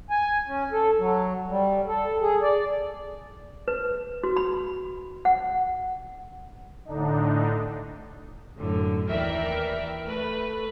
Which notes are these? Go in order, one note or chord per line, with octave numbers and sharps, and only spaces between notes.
G#5
C#4
A4
F#3
G3
A4
G#4
D5
B4
F#4
B5
F#5
A2 D3 D4 D#4
F#2 A2 D3
D#2 E3 A#4 D5 E5 G5
A3 B4